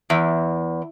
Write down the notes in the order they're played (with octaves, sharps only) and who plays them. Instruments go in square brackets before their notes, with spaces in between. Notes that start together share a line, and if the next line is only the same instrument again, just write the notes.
[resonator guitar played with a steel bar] E2